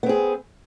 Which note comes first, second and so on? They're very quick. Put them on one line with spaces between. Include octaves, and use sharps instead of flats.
B3 C4 G#4